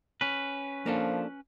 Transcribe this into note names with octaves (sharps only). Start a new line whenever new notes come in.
C#4 B4
F3 A#3 D4 A4